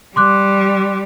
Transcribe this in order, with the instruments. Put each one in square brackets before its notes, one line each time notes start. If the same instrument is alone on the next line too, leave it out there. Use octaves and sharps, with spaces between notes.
[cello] G3 [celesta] C6 D6 F#6